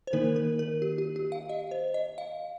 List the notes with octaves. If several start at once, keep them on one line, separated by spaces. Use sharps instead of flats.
C5
D#3 A#3 D#4 A#4
A#4
A#4
G4
G4
G4
F5
D#5
C5
D#5
F5